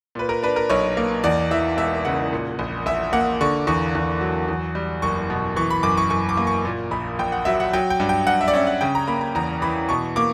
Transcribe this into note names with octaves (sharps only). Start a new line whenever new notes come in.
A#2 B4
A#4
D4 B4
A#4
B1 C#5
A#3
E2 D5
E3 E5
E1 E5
C#3 F#5
A#2
A#1
A#1 E5
A#3 F#5
D3 C#6
E2 C#6
E2
F#3
E2
G3
F#1 C#6
B2
E3 C#6
B5
F#2 D6
C#6
F#2 C#6
D6
A#3
C#6
A#2
A#1 B5
A#1 G5
F#5
F#3 E5
F#5
F#3 G5
G5
G2
G5
G2 F#5
E5
D5
C#4 E5
F#5
C#3 G5
A#5
A#3 B5
A#5
E2 A#5
E3 B5
B2 C#6
A#3 D6